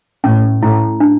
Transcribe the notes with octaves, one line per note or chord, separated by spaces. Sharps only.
A2 C#4
A2 E4
D4